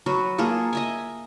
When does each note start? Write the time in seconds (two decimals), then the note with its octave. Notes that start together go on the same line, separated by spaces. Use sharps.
0.06 F#3 F#4 B4
0.38 A#3 F4 G#4 A4
0.73 D#5 E5 G#5